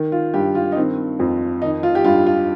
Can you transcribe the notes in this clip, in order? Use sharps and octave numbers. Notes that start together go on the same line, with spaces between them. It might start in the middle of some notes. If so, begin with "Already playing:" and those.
Already playing: D#3
F4
G2 G4
F4
D#4
D#3 C4
F2 C4
D#3 D#4
F4
G4
G2 F4
F4